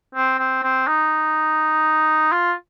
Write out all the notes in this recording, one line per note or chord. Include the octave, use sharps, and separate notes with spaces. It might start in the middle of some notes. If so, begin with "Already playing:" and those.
C4
C4
C4
D#4
F4